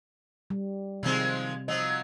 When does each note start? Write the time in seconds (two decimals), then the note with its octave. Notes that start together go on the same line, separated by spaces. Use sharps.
0.50 G3
1.03 C3 D#3 F3 G#3 C4
1.68 F3 F#3 D#5